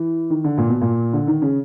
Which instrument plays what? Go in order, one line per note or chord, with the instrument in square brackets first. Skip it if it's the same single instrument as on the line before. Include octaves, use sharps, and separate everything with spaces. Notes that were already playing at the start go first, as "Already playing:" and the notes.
Already playing: [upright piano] E3
D#3
D3
A#2
B2
A#2
D3
D#3
C#3